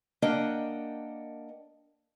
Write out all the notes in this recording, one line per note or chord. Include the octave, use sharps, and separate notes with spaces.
A#3 D4 A#4 D#5 F#5 G5